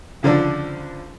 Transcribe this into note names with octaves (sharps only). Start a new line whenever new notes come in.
C#2 D3 F3 D4